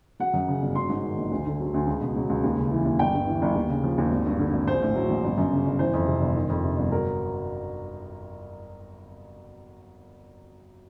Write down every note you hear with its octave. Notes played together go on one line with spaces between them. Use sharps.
F#3 F#5
F#2
C#3
G1
F#3 C6
G#2
D#3
A#1
D2
D3
F#3
D2
C#2
B2
F#3
C#2
D#2
C#3
E3
D#2
G1 G5
G2
E3
G1
D#2
C#3
F3
D#2
G#1
G2
D3
G#1
A#1 C5
A2
F#3
A#1
G1
F#2
C#3
G1
E3 C5
F2
C3
G1
D#3
F2
C3
G1
F#3 A#4